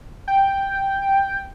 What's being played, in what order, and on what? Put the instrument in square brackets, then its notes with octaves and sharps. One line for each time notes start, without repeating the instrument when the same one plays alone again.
[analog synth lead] G5